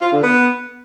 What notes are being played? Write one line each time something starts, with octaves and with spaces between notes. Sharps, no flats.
F4
D3
B3